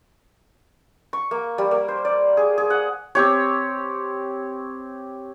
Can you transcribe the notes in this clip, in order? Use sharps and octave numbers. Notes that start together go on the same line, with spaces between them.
C#6
A#3
G3
A#3
C5
D5
G#4
G#4
F#5
C4 G4 C#5